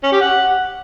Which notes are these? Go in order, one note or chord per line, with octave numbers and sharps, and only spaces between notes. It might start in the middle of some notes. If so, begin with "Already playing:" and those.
C#4
G4
F#5